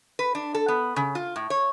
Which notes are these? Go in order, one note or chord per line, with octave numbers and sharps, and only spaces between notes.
B4
D4
A4
B3
C#3
F4
A2
C#5